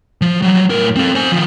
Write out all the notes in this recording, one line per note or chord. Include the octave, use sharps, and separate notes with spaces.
F3
F#3 G3
A2 A#4
C4 A4
C5 G#5
D#3 F3